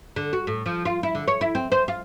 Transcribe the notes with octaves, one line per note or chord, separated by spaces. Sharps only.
D3
F#4
A2
F3
F4
E4
D3
C#5
E4
C4
C5
F4